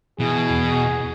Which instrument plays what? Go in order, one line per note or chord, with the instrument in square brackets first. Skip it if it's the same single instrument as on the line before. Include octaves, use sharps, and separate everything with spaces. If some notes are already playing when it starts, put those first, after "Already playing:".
[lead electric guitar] B2 [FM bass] E3 [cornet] G#4
[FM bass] E2